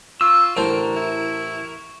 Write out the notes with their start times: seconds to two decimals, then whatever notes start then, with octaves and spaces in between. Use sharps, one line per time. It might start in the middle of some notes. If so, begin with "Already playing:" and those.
0.21 F4 C#6 E6
0.57 A1 D3 A4 A#4 C5
0.96 E4